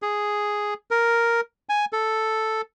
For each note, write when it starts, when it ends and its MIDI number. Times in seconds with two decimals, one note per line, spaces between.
0.02 0.74 68
0.91 1.41 70
1.69 1.85 80
1.93 2.61 69